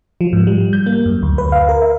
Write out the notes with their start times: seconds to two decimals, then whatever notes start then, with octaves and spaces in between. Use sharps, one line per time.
0.21 F3
0.33 G#2
0.47 G3
0.73 G6
0.86 A#3
1.06 F#2
1.23 D2
1.38 B4
1.52 F5
1.69 A#4
1.82 E5